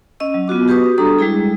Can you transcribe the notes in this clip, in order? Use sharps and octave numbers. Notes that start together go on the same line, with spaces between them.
C#4 D#5 E6
F#3
B3 F4 F#4 D6
F#4 G4 B4 C#6 D#6
G3 D4 A4 A#5 D#6
G3 G#3 E4 G#4